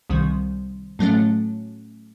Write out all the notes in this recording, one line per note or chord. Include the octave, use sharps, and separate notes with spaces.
C2 C3 D#3 G3
A2 F#3 A3 C#4